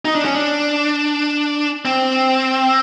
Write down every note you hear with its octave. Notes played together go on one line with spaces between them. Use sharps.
D#4
D4
C#4
D4
C4